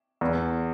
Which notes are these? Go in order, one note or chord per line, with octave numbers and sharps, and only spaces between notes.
E2